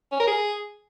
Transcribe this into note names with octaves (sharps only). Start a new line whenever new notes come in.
C#4
A#4
G#4